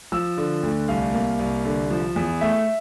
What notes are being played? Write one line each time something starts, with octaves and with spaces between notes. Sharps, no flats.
F3 E6
D3
D2
C2 F5
A#3
C2
D3
F3
E2
A3 E5